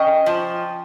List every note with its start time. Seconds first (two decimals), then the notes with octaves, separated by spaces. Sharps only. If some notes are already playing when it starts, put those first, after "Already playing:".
Already playing: C#4 D#5 G5
0.26 F3